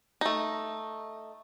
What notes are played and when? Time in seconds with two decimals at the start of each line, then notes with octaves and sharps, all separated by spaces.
0.21 A3 D#4